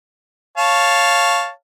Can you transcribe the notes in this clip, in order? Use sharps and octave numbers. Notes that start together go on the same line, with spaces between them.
C#5 F5 A5